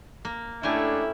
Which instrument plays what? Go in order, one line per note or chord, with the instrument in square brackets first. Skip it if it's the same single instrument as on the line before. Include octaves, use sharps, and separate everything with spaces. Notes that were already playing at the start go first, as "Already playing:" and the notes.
[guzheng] A#3
[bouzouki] A2 [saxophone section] A3 D4 [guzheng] C#4 G4 G#5 [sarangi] E4